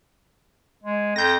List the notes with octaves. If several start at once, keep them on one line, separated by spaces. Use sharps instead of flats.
G#3
F2 G6 A#6